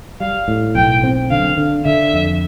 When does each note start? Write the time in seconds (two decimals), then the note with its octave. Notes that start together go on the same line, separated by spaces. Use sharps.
0.20 G3 F5
0.48 A2
0.75 B1 G5
1.04 C4
1.31 D3 F5
1.57 D3
1.86 D3 E5
2.13 F2